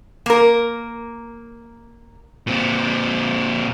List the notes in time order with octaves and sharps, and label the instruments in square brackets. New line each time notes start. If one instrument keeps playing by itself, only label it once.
[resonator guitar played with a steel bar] A#3 A#4
[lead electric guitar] A#2 C4